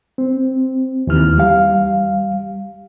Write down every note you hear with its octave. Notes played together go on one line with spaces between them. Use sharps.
C4
D#2 E3 F6
G3 F5